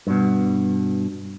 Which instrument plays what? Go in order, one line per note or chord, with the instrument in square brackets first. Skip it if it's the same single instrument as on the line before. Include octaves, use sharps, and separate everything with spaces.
[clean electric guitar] G2 B2